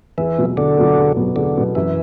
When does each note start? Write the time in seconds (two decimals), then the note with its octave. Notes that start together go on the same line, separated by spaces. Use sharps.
0.18 E2 E3
0.38 B2 F#3 B3
0.57 E2 D3
0.77 B2 F#3 B3
0.96 E2
1.17 B2 F#3 B3
1.36 E2 D3
1.56 B2 F#3 B3
1.75 F#2 E3